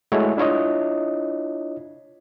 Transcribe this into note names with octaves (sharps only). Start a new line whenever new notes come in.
G#3 A3 E4 F#4 C#5
D4 E4 F4 C#5 D#5